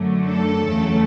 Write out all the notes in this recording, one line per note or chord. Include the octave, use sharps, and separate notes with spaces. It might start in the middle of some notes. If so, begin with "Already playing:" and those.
Already playing: F#2 D3 F#3 A3
A4
E2 C#3 F#3 A3